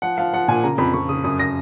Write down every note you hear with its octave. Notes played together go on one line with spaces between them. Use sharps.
F3 F#5
F3 F5
F3 F#5
A#2 G#5
C#3 A#5
F2 B5
F2 C#6
C#3 D#6
F#2 D#6
A#6